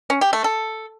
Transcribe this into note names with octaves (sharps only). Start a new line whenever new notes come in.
C#4
G4
A3
A4